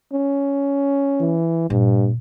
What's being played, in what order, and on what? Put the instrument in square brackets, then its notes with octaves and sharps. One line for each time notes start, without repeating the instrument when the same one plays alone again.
[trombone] C#4
[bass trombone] E3
[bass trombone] G2 [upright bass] A#2